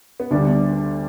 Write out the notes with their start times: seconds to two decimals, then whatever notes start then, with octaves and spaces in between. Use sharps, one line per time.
0.20 B3
0.31 D2 D3 G3 D4